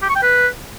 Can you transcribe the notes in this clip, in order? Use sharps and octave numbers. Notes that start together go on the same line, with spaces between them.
G4
C#6
G5
B4